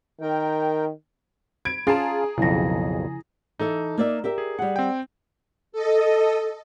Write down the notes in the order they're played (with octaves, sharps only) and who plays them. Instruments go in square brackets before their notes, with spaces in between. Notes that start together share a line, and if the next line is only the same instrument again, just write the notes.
[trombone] D#3 [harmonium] A#4 G5
[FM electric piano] B5 [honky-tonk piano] G#6 D7
[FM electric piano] C#4 [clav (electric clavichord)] F4 A5 [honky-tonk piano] G#4 A#5
[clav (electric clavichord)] B1 F2 [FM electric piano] C#3 F3 [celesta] E4 A#6
[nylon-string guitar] E3 A4 E5 [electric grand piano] D#4
[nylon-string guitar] A#3 D5 E5
G4 A#4 E5
[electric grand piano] G#4
[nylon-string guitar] G3 F#5
[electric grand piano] C4 G5
[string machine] A4 D#5